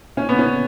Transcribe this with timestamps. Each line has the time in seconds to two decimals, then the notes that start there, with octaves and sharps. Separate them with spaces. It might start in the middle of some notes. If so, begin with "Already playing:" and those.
0.17 C#4
0.29 B3
0.39 C#4